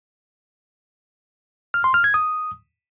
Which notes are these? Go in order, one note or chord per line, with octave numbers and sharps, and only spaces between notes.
F6
C6
F6
G#6
D#6